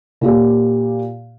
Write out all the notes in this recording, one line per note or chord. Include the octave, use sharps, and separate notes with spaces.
A#2 F4 G4